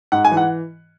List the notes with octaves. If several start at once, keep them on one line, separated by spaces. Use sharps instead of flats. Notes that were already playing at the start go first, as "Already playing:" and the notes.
G#2 F#5
G#5
E3
F#5